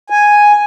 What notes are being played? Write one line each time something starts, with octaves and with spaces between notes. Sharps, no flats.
G#5